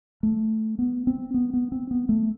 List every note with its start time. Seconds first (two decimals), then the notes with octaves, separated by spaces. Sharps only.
0.23 A3
0.79 B3
1.07 C4
1.34 B3
1.53 B3
1.72 C4
1.91 B3
2.09 A3